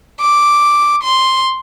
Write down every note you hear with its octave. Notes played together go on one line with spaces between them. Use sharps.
D6
C6